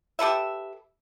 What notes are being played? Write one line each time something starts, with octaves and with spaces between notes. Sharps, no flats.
G4 A4 B4 E5